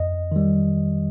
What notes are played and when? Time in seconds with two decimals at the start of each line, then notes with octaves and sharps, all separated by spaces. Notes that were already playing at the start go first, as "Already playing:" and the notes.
Already playing: F2 D#5
0.32 D#3 G3